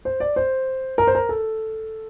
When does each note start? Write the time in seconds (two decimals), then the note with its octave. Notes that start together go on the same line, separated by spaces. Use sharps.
0.05 C5
0.20 D5
0.36 C5
0.98 A#4
1.07 C5
1.15 A#4
1.29 A4